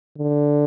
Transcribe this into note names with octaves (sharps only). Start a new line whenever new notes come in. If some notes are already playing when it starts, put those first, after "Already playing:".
D3